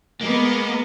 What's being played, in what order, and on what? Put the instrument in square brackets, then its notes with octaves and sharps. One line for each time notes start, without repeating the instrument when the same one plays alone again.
[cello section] G#3 B3 [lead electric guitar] A#3